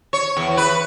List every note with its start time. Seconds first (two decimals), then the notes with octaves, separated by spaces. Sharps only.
0.13 C#5
0.37 E2
0.57 B4